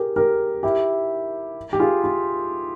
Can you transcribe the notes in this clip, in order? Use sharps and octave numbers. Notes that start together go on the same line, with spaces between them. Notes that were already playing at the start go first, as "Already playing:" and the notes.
Already playing: G4 G#4 A#4
G4 A#4
E4 G4
G4
F4 G#4
F4